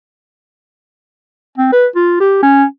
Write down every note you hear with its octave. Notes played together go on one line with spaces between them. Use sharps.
C4
B4
F4
G4
C#4